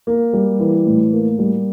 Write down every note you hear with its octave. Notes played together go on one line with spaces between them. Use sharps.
A#3
G3
E3
A2
A#3
G3